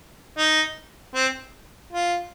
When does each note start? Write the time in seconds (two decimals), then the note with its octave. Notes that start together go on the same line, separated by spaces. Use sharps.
0.38 D#4
1.15 C4
1.92 F4